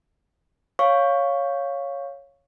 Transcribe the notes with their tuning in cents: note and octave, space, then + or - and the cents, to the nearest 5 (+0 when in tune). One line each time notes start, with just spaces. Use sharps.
C#5 +0 F5 +0 C#6 +0